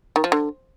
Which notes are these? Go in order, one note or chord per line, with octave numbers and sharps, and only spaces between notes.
D#3
F3
D3